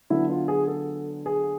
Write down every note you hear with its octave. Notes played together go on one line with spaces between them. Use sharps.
D3 F#3 B3 E4
F4
G#4
A4
G#4